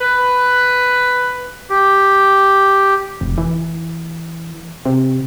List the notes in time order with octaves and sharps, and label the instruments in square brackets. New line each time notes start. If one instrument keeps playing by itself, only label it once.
[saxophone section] B4
[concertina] G4
[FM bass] F1
E3
C3